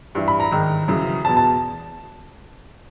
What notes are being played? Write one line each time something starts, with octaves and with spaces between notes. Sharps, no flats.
G2 E3
B5
A#5
G#2 D#3
F#2 C#3 E3
E2 B2 A5
A5